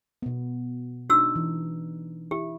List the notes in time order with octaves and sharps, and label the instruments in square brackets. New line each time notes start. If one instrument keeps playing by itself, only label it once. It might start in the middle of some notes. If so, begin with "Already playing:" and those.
[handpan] B2 B3
[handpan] D4 D#4 [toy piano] F#4 E6
[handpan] E3
[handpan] E4 [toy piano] G4